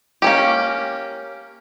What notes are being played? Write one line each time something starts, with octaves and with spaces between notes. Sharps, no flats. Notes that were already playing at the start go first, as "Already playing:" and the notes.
A#3 C#4 G4